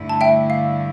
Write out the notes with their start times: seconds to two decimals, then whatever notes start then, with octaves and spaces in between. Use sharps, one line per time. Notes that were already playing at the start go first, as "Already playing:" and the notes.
Already playing: G2 D3 A3 E4
0.09 A5
0.21 E5 G5
0.50 F5